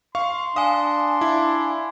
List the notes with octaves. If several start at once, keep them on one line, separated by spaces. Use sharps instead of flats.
F5 C6 C#6
D4 F5 G#5 D#6
E4